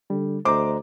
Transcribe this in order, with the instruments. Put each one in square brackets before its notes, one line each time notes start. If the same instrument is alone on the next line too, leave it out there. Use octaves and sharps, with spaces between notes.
[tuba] D3 [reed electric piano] G3
[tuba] D2 [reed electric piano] C5 D#5 A#5 [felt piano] D6